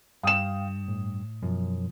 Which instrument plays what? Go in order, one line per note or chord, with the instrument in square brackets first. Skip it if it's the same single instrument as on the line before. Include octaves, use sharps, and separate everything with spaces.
[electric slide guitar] G2 [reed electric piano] F5 G5 [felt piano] D#6 E7
[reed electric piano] A2
[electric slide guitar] F#2 [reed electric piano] B2 F3